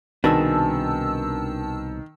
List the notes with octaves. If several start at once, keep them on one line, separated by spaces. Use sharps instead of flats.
C2 B2 D#3 D4 D#4 G#4 A5 E6